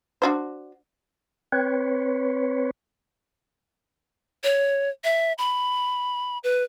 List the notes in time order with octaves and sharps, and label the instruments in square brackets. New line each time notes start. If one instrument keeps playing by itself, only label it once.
[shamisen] D4 F#4 C5
[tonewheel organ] C4 B4 C#5
[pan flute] C#5
E5
B5
B4